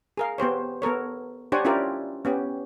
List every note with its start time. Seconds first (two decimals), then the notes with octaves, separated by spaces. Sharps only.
0.17 G#4 A#4 F5
0.38 B3 G4 C5 C#5
0.82 B3 A4 A#4 C#5
1.52 D4 G4 C5 C#5 F#5 G#5
1.65 C#4 E4 F4 G4 A#4 D5
2.25 B3 C#4 G4